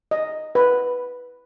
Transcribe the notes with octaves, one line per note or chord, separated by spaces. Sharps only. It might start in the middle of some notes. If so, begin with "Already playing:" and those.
D#5
B4